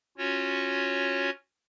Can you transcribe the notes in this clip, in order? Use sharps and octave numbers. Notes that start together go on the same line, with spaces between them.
C#4 F4 F#4 C#5